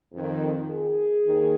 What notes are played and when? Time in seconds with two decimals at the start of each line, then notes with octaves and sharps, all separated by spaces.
0.12 F2
0.17 D#3
0.68 G#4
1.24 D#2 D#3